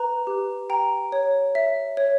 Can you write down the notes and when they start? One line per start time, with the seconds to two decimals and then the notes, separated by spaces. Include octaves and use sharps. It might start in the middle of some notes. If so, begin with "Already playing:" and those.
Already playing: B4 A#5
0.27 G4
0.70 G5 A#5
1.12 C#5
1.55 E5
1.97 C#5